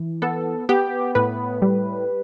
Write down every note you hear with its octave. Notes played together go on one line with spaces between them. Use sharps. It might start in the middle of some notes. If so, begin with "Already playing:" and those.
Already playing: E3
B3 A4
B3 G4
A2 B4
G3